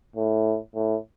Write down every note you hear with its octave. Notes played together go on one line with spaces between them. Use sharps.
A2
A2